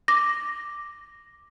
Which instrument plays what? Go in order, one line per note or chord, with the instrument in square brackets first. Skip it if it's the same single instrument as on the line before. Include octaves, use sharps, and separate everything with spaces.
[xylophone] D6 A#6